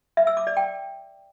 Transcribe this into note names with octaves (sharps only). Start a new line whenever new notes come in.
E5
E6
D6
D5
G5